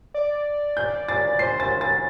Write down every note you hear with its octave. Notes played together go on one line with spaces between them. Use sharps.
D5
G6
A6
C5 C7
A6
A6